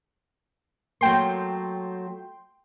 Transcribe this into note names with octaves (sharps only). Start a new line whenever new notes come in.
F#3 A3 A#3 G5 C6